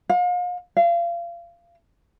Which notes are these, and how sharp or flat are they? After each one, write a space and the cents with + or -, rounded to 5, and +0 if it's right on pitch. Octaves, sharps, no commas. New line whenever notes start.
F5 +40
F5 -30